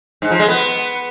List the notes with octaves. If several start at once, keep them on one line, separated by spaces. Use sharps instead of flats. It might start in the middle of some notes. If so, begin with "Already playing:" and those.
G#2
F3
G#3
B3